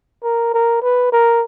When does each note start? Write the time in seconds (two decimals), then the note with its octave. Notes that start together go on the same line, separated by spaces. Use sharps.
0.23 A#4
0.54 A#4
0.82 B4
1.12 A#4